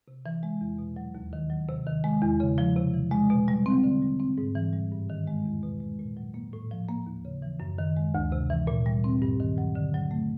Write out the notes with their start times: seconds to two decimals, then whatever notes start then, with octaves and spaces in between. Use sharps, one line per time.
0.08 C3
0.26 E3
0.43 G#3
0.61 E2
0.78 B2
0.96 F#3
1.15 D#2
1.33 D#3
1.50 F#3
1.69 C3
1.86 D#3
2.04 G#3
2.22 E2
2.40 C#3
2.58 F3
2.76 C3
2.94 E3
3.11 G#3
3.30 B2
3.48 G3
3.66 C4
3.84 D3
4.02 G3
4.19 C4
4.38 G#2
4.55 E3
4.73 G3
4.92 G2
5.10 D#3
5.27 G#3
5.45 E2
5.63 B2
5.80 G#3
5.99 A#2
6.17 F#3
6.34 A#3
6.53 A2
6.71 F3
6.89 A#3
7.07 D#2
7.25 C#3
7.42 E3
7.60 F#2
7.78 D#3
7.97 G#3
8.14 D2
8.32 C3
8.50 E3
8.67 A#2
8.86 G3
9.04 C4
9.22 G2
9.40 D#3
9.58 F#3
9.75 D3
9.94 F#3
10.11 A3